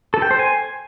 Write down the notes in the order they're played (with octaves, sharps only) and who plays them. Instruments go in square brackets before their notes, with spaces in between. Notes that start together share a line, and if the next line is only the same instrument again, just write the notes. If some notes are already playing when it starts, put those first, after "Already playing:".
[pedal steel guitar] A4
G5
C5
G#5